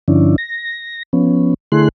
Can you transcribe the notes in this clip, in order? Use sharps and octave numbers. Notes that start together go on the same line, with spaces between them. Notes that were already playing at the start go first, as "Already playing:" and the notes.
G2 D3 F3 C#4 D4 E4
A#6
F3 B3 C#4
D3 A3 E4 G#4 C6 F#6